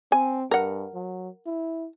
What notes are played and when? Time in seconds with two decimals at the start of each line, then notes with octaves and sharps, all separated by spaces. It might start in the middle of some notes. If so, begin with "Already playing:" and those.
0.12 C4 G#5
0.51 G2 A#4 F#5
0.94 F#3
1.46 E4